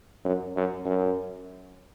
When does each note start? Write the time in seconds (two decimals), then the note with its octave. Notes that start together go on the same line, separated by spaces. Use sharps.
0.25 F#2
0.56 F#2
0.85 F#2